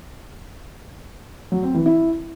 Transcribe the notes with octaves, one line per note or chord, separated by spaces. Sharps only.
F#3
C4
E3
E4